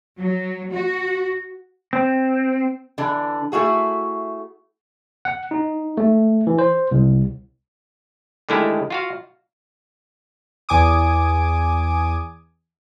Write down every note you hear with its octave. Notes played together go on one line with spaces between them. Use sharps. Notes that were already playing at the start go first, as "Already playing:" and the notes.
F#3
F#4
C4
D3 E3 D4
A3 E4 F#4 G#4
F#5
D#4
A3
E3
C5
C2
D3 D#3 G#3 A3 E4 G4
F4 F#4 F5
E2 G#5 D6 D#6